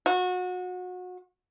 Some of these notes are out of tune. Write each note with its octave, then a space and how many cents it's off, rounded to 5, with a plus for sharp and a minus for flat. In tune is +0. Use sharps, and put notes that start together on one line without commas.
F#4 -30